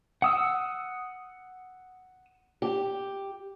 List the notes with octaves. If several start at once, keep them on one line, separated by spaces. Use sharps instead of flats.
F#5 D#6 E6
G4